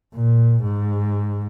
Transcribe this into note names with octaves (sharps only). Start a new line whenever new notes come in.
A#2
G#2